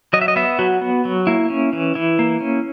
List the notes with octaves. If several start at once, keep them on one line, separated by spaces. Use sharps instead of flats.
F#3 D#5
E5
D#5
B3 E5
F#3 F#4
B3
F#3
A#3 E4
C#4
E3
E3 E4
A#3
C#4